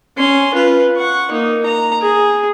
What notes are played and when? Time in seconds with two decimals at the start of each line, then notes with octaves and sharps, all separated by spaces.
0.17 C#4 C6
0.54 F4 B4
0.97 F#5 C#6
1.31 A#3 D#4
1.66 A#5
2.02 G#4